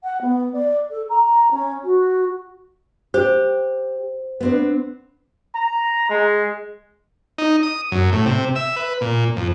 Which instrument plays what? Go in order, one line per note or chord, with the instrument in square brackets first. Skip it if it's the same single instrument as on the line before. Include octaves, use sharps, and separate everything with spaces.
[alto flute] F#5
B3
D5
A4
A#5
C#4
F#4
[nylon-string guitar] G4 [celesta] C5
[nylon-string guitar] B3 C4 D4
[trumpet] A#5
G#3
[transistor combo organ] D#4
D#6
F#2
A2
C3
E5
B4
A#2
F2